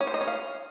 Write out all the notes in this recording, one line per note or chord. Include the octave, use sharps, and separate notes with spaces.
C#4
C5
D#5
C#4
F5